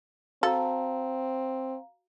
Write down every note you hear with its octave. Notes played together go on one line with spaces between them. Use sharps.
C4 F#4 A4 F5 A5 A#5